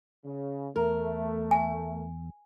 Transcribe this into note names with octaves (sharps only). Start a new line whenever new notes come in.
C#3
E2 A3 A#4
G#5